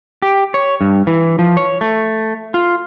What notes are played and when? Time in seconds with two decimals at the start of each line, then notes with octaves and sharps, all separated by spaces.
0.22 G4
0.54 C#5
0.81 G2
1.07 E3
1.39 F3
1.57 C#5
1.81 A3
2.54 F4